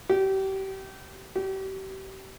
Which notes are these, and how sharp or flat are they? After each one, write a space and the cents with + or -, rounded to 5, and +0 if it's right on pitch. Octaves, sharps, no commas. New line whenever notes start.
G4 -30
G4 -35